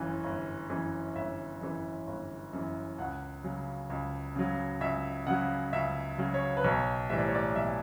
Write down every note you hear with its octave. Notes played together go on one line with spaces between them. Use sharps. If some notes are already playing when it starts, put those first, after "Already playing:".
Already playing: G1 F#2 E3
G1
F#2 E3
G1 E5
F#2 E3
G1
F#2 E3
C#2 F#5
C#3 F#3
C#2
C#3 F#3
C#2 E5
C#3 F#3 F#5
C#2 E5
C#3 F#3
C#5
B4
B1 C#5
A2 E3 G3 E5
D5
C#5
D5
B1 E5